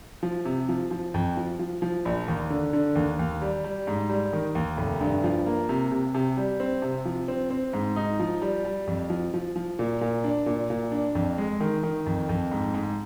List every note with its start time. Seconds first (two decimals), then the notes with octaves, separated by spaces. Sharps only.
0.23 F3
0.45 C3
0.69 F3
0.91 F3
1.14 F2
1.37 F3
1.59 F3
1.82 F3
2.05 A#1
2.28 D#2
2.50 D3
2.73 D3
2.95 D#2
3.19 D#2
3.42 G3
3.64 G3
3.87 G#2
4.09 G3
4.33 D#3
4.55 D#2
4.77 F1
5.01 G2
5.24 F3
5.46 A#3
5.69 C3
5.91 C3
6.14 C3
6.37 G3
6.60 C4
6.82 C3
7.05 F3
7.28 C4
7.50 C4
7.73 G#2
7.96 D#4
8.20 F3
8.42 G3
8.65 G3
8.87 F2
9.10 F3
9.34 F3
9.56 F3
9.79 A#2
10.01 A#2
10.24 D4
10.46 A#2
10.70 A#2
10.92 D4
11.15 F2
11.38 G#3
11.60 D#3
11.83 D#3
12.06 F2
12.29 F2
12.51 G#2
12.74 G#2